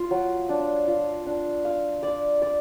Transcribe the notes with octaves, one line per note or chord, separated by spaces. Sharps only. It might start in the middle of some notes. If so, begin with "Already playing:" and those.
Already playing: F4
F#3
D4
F4
D4
F5
D5
D5